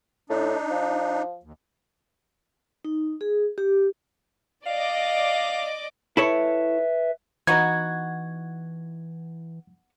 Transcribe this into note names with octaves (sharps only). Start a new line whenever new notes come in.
A2 D4 D#4
F3
D#2
D#4
G#4
G4
D5 D#5 F5 D6
E4 A4 B4 C#5 E5
E3 B3 D#4 F#4 G#6